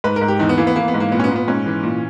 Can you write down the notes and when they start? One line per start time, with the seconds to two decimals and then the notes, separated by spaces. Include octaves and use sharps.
0.04 G#2 B4
0.16 A#4
0.21 G#2
0.28 G4
0.39 E2 D#4
0.49 B3
0.58 E3 A#3
0.67 B3
0.76 E3 A#3
0.88 B3
0.94 G#2
1.00 A#3
1.12 A#2 B3
1.20 C#4
1.24 B3
1.31 A#2
1.36 B3
1.48 G#2 C#4
1.66 E3
1.83 A#2